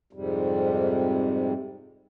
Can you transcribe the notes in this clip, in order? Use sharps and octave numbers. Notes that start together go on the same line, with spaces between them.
F2 G#2 C3 G3